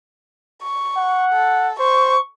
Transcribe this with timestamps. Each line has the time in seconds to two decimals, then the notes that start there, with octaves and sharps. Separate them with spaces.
0.63 C#6
0.97 F#5
1.33 A4
1.80 C5 C#6